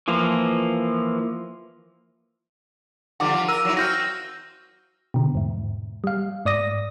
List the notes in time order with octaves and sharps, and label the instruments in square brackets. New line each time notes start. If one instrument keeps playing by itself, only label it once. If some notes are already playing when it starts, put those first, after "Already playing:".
[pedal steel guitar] E3 F3 A#3
[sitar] D3 F3 G3 [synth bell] F#5 D6
[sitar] F3
[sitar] A#4 [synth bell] E6 D#7
[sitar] F#3 E4
[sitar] C4 F#4 [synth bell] F6 G6 A#6
[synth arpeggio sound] B2 D3
E2 G#2
G3 F5
G#2 D5 D#6 A#6